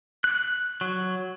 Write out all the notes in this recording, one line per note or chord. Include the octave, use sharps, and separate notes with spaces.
F#6
F#3